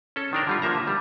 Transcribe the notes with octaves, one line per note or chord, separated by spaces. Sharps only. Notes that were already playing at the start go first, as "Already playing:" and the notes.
C#4 A4
D#3 D4 A#4
D3 G3 F4
D3 F3 A#3 E5 A#5
G3